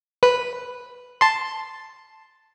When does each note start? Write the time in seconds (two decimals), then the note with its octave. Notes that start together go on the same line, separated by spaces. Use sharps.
0.23 B4
1.21 A5 C6